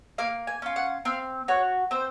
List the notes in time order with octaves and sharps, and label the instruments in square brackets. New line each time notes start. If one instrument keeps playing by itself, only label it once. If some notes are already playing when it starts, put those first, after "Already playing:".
[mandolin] A#3 F5
G#5
C#4 F4
F#5
C4 F5
F#4 C#5
C4 C5